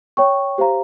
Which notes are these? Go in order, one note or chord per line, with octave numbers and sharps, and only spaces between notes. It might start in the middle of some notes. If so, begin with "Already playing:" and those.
C#5 G5 C#6
G4 C5 F5 A#5